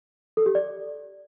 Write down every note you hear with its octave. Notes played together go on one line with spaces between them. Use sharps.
A4
G4
D5